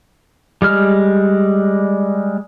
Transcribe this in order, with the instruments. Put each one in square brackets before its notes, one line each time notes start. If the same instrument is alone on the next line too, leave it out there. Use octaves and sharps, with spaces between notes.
[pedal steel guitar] G3 G#3 F6